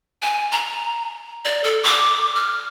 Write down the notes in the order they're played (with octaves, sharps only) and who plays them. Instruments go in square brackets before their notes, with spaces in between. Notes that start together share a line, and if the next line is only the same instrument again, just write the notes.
[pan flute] G#5
A#5
D5
A4
D6
F6